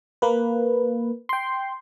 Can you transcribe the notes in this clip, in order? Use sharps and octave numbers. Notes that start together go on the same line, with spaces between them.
A#3 B4
G5 C6